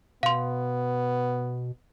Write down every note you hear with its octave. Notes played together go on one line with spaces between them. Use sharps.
B2 B3 F5 C6